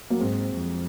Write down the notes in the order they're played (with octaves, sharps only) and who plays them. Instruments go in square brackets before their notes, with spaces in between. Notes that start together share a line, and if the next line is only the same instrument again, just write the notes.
[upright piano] F#3 A#3
[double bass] G#2 [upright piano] G#3 C4
[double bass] F2